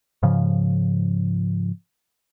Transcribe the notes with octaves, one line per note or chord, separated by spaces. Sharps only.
G#2 C#3 F3